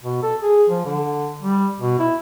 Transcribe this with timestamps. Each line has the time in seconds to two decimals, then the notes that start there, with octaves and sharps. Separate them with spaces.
0.04 B2
0.23 A4
0.42 G#4
0.70 F3
0.86 D3
1.42 G3
1.81 B2
1.99 E4